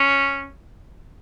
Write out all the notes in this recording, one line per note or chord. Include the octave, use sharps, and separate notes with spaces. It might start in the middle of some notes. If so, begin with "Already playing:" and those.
Already playing: C#4